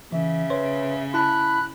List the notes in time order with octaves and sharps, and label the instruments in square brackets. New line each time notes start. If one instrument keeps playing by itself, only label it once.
[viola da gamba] C#3 [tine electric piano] E3 [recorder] E5
[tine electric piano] B4 C#5 C6
[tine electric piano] E4 A5 [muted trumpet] B5 [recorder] F#6